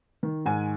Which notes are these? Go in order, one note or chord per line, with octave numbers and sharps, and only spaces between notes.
D#3
G#2 G#5